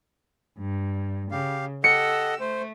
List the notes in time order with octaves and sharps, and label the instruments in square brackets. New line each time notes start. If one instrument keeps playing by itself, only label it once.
[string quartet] G2
[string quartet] C#3 [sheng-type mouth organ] G4 F5
[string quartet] G4 E6 [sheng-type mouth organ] A4 D#5 F#5 [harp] C#7
[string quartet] A3 [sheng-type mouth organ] C5